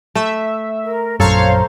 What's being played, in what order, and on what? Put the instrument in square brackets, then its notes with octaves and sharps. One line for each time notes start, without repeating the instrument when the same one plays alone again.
[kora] A3 [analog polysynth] E5
[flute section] A#4
[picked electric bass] A#1 F#2 [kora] A4 [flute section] C5 A#5 C6 [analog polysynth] C#5 F5